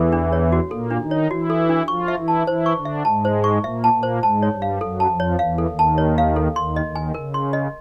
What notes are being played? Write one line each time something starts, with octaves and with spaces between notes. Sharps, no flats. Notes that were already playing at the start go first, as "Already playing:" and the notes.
Already playing: E2 E3 A4
D4
C#5
F#4
A#2 A#3 A4
D4
D#3 D#4
C#5
E3 E4 F#4
A4
D4
F3 F4 C#6
E5
E3 E4
A5
E3 E4 C5
C#6
D3 D4
E5
G#2 G#3 A5
C5
C#6
A#2 A#3 E5
A5
A#2 A#3
C5
G#2 G#3 A5
C#5
G2 G3
F5
F#2 F#3 A4
A5
F2 F3
C#5
E2 E3 F5
A4
D#2 D#3
A5
C#5
F5
A4
D#2 D#3 C6
D#5
D#2 D#3
G#5
C#3 A#4
C6
D#5